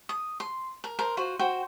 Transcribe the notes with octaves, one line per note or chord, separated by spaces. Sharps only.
D#6
C6
A#4
A#4 C5
F4 F#4 C5
F#4 C5 G5